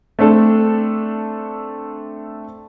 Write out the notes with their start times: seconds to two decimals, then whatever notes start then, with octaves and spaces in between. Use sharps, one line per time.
0.19 A3 C4 D4 A4